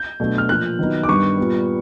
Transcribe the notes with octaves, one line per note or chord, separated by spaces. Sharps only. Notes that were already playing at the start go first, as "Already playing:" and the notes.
Already playing: G6
B2 F#3 A3 D4
F6
A#2 F3 A#3 F#6
D#3 F#3 B3 D#4
D6
G2 D#3 G3 B3 C#6
A#2 G3 B3